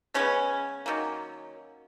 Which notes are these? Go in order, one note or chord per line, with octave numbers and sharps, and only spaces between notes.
C#3 G#3 B3 C#4
D#3 F#3 A#3